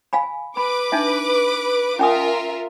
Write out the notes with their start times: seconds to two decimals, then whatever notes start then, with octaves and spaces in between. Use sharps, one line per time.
0.13 F5 G#5 B5
0.57 B4 B5 D6
0.92 D4 D#4 E5
1.99 C#4 F4 A#4 E5 G#5 D#6